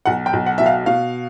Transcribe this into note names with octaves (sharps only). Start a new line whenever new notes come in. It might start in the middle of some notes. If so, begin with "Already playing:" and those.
B1 F#5
G5
B1
F#5
B2 E5
F5
B2 F5